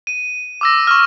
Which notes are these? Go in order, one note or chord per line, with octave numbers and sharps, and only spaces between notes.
D#7
D6 E6 A#6
C#6 E6 F6